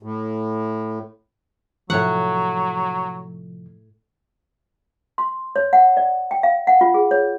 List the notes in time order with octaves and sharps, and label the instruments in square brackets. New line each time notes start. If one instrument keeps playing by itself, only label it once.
[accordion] A2
[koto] A2 C#5 F#5 [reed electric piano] C3 F3 [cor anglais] F#3
[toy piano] C6
C#5
F#5
D5
G5
F5
F#5
F4
G#4
C#5